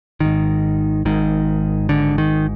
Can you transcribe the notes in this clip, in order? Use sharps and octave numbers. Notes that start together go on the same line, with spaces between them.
G#1 G#2 D#3
G#1 G#2 D#3
G#1 G#2 D3
D#3